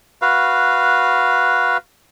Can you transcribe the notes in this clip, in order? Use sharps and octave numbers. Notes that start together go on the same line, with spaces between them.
F#4 B4 F5